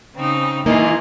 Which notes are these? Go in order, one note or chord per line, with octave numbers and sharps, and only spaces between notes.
C#3 C4 D#4
E3 G#3 A#3 D#4 F4 D#5